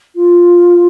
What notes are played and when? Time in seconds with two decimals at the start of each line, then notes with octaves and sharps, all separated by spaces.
0.16 F4